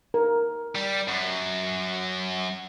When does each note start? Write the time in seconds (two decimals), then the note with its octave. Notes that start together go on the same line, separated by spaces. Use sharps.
0.14 A#4
0.75 G3
1.08 F#2